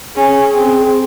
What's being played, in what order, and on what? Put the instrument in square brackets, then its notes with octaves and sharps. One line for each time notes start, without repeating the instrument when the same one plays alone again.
[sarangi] C#4 [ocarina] G#4
[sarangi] C4